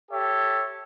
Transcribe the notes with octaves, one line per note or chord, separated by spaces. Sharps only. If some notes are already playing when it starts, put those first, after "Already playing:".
G4 A4 C#5 E5